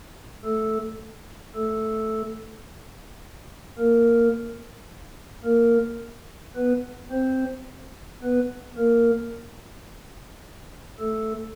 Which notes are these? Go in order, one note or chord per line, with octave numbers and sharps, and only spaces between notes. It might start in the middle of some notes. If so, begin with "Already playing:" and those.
A3 A4
A3 A4
A#3 A#4
A#3 A#4
B3 B4
C4 C5
B3 B4
A#3 A#4
A3 A4